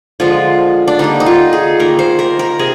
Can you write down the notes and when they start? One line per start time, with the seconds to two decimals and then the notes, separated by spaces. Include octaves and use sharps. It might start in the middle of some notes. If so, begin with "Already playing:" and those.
0.20 D3 F3 G#3 F4
0.88 D4
0.99 D3 G3 A#3 D#4
1.20 D#4
1.26 F4
1.53 G#4
1.79 D#3 A#3 A#4
1.99 C5
2.19 A#4
2.39 A#4
2.59 C3 G#4